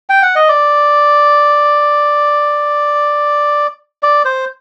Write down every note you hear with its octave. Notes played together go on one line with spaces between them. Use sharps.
G5
F#5
D#5
D5
D5
C5